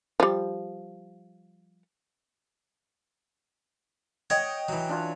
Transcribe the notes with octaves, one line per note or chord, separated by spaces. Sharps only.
F3 G3
C#5 D#5 F#5 G5 G#6
E3 F#3
D4 F4 C#5